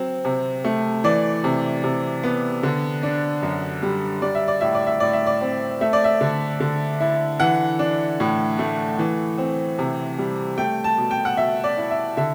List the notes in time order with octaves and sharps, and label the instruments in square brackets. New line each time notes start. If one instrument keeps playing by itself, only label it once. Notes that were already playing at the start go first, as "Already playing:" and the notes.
Already playing: [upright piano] F#3 C4
C3
A3
E3 D5
C3
C3
B3
D3
D4
F#2
G3
G3 D5
E5
D5
A2 E5
D5
E5
A2 D5
E5
D5
C4
A3 E5
D5
E5
D3
D3
E4
E3 F#5
D4
A2
A3
E3
C4
C3
G3
A3 G5
A5
B2
G5
F#5
B2 E5
D5
E4
E5
D3 E5